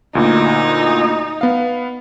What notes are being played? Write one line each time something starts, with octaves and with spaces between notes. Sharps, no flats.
D2 A#2 D#4
B3 F5